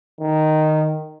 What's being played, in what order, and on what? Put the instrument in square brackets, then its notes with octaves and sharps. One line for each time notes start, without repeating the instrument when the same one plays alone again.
[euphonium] D#3